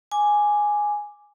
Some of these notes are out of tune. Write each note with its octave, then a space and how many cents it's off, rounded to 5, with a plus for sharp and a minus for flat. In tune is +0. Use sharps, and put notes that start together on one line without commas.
G#5 +0 D6 +0